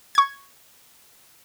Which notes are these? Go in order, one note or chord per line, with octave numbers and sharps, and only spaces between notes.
C#6 G#6